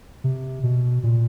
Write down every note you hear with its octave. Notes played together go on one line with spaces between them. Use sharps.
C3
B2
A#2